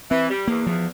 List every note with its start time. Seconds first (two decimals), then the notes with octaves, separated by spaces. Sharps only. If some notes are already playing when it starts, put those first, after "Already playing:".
0.10 E3 C4
0.29 G3
0.47 E2 A#3
0.66 E2 F3